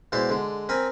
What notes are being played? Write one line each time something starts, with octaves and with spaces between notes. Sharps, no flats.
B2 G#3 E4 C5 D5
D3 G#3
C4 A#4 G#5 B5